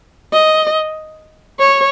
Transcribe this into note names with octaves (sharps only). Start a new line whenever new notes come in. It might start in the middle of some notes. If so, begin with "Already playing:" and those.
D#5
C#5